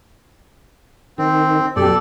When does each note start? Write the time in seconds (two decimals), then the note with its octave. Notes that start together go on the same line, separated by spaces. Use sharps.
1.18 D#3 C4
1.76 F#2 B2 G4 A4 D5